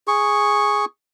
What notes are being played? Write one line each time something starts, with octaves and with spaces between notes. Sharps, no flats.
G#4 C#6